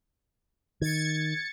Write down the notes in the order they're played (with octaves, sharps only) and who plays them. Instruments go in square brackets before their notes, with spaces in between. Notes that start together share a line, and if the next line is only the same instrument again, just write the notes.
[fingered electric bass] D#3 [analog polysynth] G#6 A6 C#7